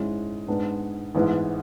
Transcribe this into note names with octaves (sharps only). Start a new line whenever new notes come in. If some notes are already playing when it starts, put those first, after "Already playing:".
Already playing: G#2 G#3 C#4 E4
G#2 G#3 B3 D4
A1 G#2 G#3 B3 E4